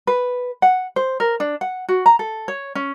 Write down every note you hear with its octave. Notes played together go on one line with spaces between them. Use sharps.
B4
F#5
C5
A#4
D4
F#5
F#4
A#5
A4
C#5
C#4